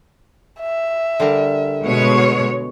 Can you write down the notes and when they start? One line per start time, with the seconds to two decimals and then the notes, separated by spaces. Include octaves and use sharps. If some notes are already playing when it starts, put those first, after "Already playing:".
0.61 E5
1.20 D3 G3 A#4
1.84 B2 G#3 C#5